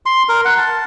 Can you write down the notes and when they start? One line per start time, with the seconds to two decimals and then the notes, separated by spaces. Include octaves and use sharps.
0.06 C6
0.29 A#4
0.45 F#5
0.58 A5